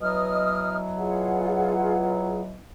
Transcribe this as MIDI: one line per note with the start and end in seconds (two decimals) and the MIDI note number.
0.01 2.56 47
0.01 2.56 52
0.01 2.56 54
0.01 0.77 75
0.01 0.77 87
0.01 0.77 89
0.98 2.40 65
0.98 2.40 68
0.98 2.40 78